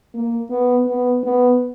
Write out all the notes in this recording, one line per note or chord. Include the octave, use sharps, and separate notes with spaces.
A#3
B3
B3
B3